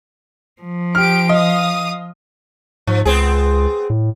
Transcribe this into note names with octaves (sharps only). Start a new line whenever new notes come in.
F3
G4 F6 D7
D#5 F5 D#6
G#2 F3
C#2 B3 C4 G#4
A2